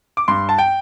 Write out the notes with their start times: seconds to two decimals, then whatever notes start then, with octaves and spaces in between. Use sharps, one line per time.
0.17 D6
0.28 G2 C6
0.49 A5
0.58 G5